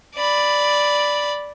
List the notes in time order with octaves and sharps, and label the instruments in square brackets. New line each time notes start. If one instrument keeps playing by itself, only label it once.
[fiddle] D5 B5